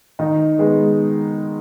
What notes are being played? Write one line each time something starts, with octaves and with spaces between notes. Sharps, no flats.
D#3 D#4
G#3 B3